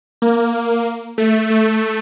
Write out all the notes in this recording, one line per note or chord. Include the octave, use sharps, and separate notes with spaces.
A#3
A3
A3